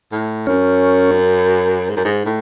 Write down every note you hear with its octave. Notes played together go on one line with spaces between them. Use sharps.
A2
F#2 C#4
G#2
F#2
G#2
A2